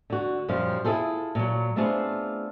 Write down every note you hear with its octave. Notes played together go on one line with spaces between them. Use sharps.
D3 F#4
F#2 A#2 F3 G3 F4
E4 F4 G#4 A4 C5
A#2 F#3
A3 B3 C4 D4 F4 G#4